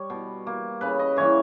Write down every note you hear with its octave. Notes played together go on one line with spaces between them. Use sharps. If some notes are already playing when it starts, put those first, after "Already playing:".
Already playing: G3 C#5
B2
A#3
C#3 B4
D#5
E3 G3 A#3 C#5